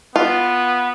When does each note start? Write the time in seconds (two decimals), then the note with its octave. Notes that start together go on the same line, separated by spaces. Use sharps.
0.16 B3 F4